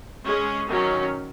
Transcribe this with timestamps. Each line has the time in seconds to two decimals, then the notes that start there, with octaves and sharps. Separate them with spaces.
0.25 G#3 C#4 G#4
0.68 D#3 F#3 C#4